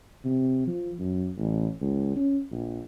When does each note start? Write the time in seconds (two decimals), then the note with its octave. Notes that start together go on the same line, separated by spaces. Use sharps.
0.25 C3
0.67 F3
0.99 F#2
1.37 A1
1.81 C#2
2.16 C#4
2.52 A#1